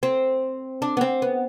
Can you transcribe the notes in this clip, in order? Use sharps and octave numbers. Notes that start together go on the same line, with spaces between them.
C4
D4
B3
C4
B3